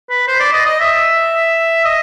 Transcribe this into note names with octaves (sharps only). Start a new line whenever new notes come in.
B4
C5
D5
D#5
D#5
E5
D#5